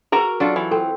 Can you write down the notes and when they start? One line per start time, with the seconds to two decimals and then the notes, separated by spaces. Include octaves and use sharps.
0.12 F#4 G#4 A#4 B4 A#5
0.40 F#3 D4 F4 A4
0.56 E3
0.71 C4 A4